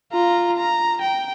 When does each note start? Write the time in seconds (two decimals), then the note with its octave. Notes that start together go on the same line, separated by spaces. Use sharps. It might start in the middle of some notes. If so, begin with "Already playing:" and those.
0.12 F4 A#5
0.57 A#5
1.02 G5